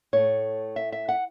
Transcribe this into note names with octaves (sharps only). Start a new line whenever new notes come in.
A2 A3 C#5
E5
E5
F#5